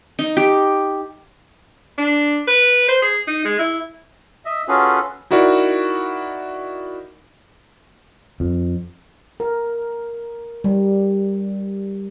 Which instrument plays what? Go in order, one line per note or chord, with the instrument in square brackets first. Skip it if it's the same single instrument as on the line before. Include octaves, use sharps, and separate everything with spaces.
[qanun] D#4
G4
[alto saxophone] D4
B4
C5
G#4
D#4
G#3
E4
[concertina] D#5 E5
C#4 F4 F#4 G#4 A4 B4
[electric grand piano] D#4 E4 F#4 A#4 D5
[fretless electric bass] F2
[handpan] A#4
G3